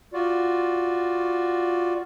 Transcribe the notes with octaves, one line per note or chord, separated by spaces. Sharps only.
F4 F#4 D5